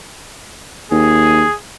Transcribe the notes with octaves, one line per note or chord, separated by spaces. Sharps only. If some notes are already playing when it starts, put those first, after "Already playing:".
D#2 G#4